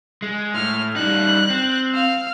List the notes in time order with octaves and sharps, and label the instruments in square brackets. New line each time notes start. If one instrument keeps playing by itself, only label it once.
[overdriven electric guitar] G#3
[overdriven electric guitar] A2 [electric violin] F6
[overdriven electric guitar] G3 D#4 [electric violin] F#6
[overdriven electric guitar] C4
[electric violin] F5 F6